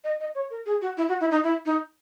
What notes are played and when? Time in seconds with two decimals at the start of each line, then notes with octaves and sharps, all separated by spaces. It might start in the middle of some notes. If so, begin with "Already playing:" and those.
0.04 D#5
0.20 D#5
0.35 C#5
0.50 A#4
0.66 G#4
0.82 F#4
0.97 E4
1.09 F#4
1.20 E4
1.31 D#4
1.43 E4
1.66 D#4